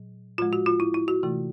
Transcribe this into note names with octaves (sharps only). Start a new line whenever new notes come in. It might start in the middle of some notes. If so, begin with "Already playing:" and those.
Already playing: A#2 F#3
A2 F3 G#3 F4
F#4
F4
E4
E4
F#4
C3 E3 A3